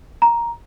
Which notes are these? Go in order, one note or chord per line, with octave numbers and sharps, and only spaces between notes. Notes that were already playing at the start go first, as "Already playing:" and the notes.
A#5